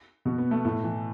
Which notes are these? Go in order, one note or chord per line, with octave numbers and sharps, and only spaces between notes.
B2 F#4
B3
A3
A2 A3
E3